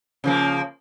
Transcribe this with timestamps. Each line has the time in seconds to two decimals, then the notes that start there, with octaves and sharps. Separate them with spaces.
0.24 C#3 F3 A#3